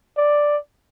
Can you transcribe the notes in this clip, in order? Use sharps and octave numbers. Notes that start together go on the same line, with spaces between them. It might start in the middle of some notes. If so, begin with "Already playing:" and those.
D5